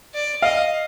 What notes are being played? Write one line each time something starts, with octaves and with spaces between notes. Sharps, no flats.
D5
D#5 F5